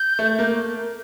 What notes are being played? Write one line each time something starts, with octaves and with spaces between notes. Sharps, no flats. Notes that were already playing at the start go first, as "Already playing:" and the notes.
Already playing: G6
A3
A#3